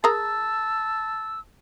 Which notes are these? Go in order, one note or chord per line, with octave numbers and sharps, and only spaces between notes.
G#4 A#4 A5 A#5 E6